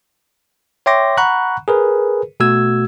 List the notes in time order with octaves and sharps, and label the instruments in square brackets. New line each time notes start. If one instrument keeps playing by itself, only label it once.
[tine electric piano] C#5 E5 G5 C6 D6 A#6
F#5 A#5 B5 C#6 F#6
G#4 A#4 B4
B2 A3 F#4 E6 G#6